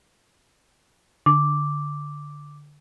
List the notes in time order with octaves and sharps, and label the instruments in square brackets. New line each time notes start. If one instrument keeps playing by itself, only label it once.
[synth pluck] D3 [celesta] D6